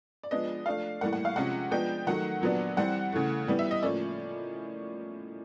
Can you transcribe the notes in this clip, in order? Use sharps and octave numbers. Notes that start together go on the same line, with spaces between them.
D5
F3 G#3 B3 D4 D#5
F3 A3 D4 F5
A2 E3 G3 A#3 F#5
F#5
F5
C3 F3 G#3 C#4 F#5
F3 G#3 B3 D4 G5
D#3 F#3 A3 F#5
A#2 F#3 B3 D4
E3 G3 C4 F#5
C#3 E3 A3
E3 G3 B3
E5
D#5
A2 F3 A#3 C#4 D5